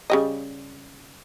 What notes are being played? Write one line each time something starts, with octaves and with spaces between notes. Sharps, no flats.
C#3 G3 D#5